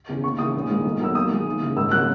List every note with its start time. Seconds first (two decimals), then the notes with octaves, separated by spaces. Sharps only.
0.09 E2 C#3
0.24 D#2 C#6
0.39 C#3 E3 D#6
0.54 A#1
0.69 G#2 D#3 G#3
0.85 B1
1.00 B2 F#3 A#3 E6
1.15 D#2 D#6
1.31 D#3 G#3
1.46 D#2
1.61 C#3 E3
1.77 G#1 E6
1.91 C#3 F#3 A#3 F#6